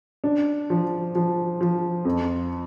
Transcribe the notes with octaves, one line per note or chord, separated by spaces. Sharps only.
D4
F3
F3
F3
F2